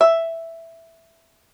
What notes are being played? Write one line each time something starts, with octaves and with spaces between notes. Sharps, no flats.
E5